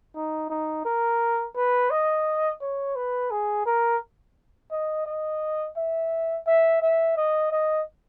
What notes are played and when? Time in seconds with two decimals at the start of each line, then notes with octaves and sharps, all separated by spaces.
0.15 D#4
0.50 D#4
0.85 A#4
1.56 B4
1.90 D#5
2.61 C#5
2.96 B4
3.31 G#4
3.66 A#4
4.71 D#5
5.06 D#5
5.77 E5
6.47 E5
6.82 E5
7.17 D#5
7.52 D#5